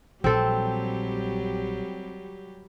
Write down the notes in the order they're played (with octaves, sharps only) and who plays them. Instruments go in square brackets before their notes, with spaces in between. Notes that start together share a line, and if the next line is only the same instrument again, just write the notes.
[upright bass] A#1 [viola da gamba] F#3 G3 G4 [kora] C4 A4